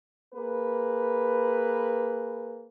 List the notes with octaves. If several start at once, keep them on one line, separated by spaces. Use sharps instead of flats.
A#3 G#4 B4